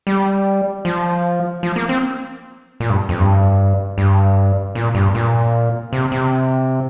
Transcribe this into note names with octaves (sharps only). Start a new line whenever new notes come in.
G3
F3
F3
A#3
C4
A#2
G2
F2
G2
G2
A#2
G2
A#2
C3
C3